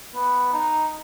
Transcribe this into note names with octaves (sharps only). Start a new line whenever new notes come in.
B3
D#4